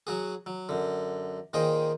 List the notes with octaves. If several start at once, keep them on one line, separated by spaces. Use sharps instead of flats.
F#3 F#4 G#4
F#3
F#2 D3
A#2 D#3 G#4 C5 D#5 G5